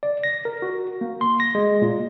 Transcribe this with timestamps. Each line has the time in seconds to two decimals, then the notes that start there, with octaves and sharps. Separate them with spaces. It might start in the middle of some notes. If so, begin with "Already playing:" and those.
0.03 D5
0.23 A#6
0.45 A#4
0.62 F#4
1.01 A#3
1.21 C6
1.40 A#6
1.55 G#3
1.82 A#2